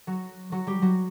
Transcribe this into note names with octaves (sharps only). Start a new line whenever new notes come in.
F#3 F#4
F#3 F#4
G3 G4
F#3 F#4